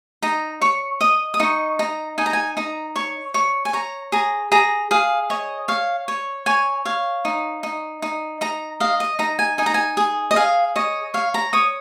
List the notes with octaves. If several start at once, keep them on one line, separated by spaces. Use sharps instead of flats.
D#4 A#5
C#5 C#6
D#5 D#6
D#6
D#4 C#6
D#4 A#5
D#4 G#5
A#5
G#5
D#4 A#5
C#5 C#6
C#5 C#6
G#5
C#5 A#5
G#4 A#5
G#4 A#5
G#4 F5
C#5 D#5
C#5 F5
C#5
C#5 G#5
C#5 F5
D#4
D#4
D#4
D#4 A#5
D#5 F5
D#5
D#4 A#5
G#5
D#4 G#5
A#5
G#5
G#4
D#5
G#4 F5
C#5 D#5
C#5 F5
A#5
C#5 D#6